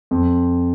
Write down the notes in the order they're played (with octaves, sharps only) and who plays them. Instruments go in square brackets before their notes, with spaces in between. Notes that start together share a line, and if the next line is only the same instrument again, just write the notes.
[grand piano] F2